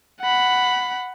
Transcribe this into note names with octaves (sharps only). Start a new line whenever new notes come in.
F#5 B5